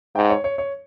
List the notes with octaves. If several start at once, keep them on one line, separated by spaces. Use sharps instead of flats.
G#2 G5
C#5
C#5
C#5